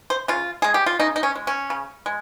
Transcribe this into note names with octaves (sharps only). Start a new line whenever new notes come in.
C5
C#3 F4
G#3 G#4
G4
F4
C#3 D#4
D#4
C#4
G#3
C#4
C#3
G#3